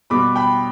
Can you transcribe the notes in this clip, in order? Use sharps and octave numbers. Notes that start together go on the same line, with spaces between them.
B2 G3 B3 B5 D6
G5 B5